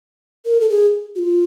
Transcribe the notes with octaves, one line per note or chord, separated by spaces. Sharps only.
A#4
A4
G#4
F#4
F4